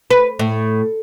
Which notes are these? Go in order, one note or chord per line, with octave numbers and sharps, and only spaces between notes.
B4
A2